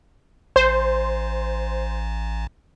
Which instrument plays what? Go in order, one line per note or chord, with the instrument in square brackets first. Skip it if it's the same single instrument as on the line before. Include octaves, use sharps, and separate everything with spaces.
[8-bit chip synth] A1 [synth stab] C5